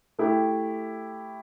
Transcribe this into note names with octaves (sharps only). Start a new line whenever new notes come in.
A3 E4 G4